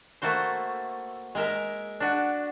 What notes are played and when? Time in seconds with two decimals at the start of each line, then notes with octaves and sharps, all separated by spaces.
0.22 A3 A#3 F#4 C5
1.35 G#3 A#4 E5
2.00 D4 F#4